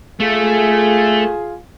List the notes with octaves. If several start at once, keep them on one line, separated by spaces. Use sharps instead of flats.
A3 F4 G#4